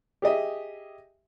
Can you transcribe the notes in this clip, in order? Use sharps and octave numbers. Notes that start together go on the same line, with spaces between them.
G4 G#4 D#5 E5